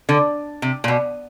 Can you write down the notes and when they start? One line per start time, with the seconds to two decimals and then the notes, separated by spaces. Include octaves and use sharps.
0.09 D3
0.62 C3
0.84 A#2
0.88 B2